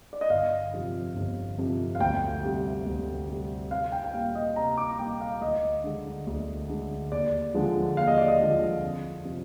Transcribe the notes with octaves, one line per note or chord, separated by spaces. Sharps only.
D5
D#5
G1 F5
F2 C3 F3
G1
F2 C3 F3
F5
D2 G5
C3 G3
D2
C3 G3
C2 F5
G5
G5
A#2 G3 A#3 F5
D#5
C2 A#5
D6
A#2 G3 A#3 G5
F5
D2 D#5
D3 G#3
D2
D3 G#3
D#2 D5
D3 F3 G#3
D#2 F5
D#5
D5
D#5
D3 F3 G#3
F2
C3 F3 C4